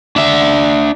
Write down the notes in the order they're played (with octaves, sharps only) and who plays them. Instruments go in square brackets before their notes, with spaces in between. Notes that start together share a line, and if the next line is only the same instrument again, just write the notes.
[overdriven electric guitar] D4 E5